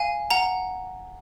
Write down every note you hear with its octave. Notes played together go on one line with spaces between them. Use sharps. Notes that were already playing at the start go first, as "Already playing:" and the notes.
Already playing: F5 G#5
F#5 A#5